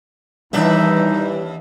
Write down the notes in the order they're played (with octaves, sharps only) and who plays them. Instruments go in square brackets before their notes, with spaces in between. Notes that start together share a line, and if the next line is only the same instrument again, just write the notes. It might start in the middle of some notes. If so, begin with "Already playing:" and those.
[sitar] D#2 D4 E5 [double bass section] E3 [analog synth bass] G3 [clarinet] D#4